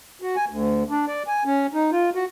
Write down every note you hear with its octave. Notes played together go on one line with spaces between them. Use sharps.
F#4
G#5
D2
D4
D5
G#5
C#4
D#4
F4
F#4